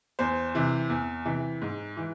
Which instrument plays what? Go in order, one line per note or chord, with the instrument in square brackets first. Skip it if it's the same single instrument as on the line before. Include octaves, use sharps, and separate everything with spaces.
[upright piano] E2 C5
C3 E3
E2
C3 E3
G#2
E3